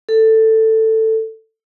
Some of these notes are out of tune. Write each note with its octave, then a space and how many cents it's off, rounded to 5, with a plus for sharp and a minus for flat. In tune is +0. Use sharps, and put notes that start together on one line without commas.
A4 +10